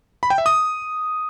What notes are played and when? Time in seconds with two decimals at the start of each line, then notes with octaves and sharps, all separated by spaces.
0.23 B5
0.30 G5
0.38 E5
0.46 D#6